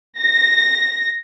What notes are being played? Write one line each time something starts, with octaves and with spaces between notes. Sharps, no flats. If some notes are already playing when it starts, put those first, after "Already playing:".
A#6